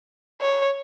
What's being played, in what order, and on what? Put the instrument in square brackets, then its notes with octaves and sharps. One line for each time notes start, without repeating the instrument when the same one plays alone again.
[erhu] C#5